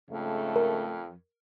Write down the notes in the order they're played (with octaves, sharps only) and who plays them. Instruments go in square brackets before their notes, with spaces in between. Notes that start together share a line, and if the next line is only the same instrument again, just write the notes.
[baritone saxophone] F2 [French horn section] G#2 C#3 A3
[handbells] A#4